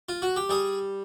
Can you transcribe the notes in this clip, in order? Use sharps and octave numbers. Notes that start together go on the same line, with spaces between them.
F4
F#4
G4
G3 G#4